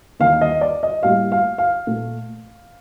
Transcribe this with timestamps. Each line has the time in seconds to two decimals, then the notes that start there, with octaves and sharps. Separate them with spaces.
0.20 D#2 D#3 A#3 F5
0.41 D#5
0.61 D5
0.83 D#5
1.03 A2 G3 A#3 F5
1.32 F5
1.58 F5
1.87 A#2 A3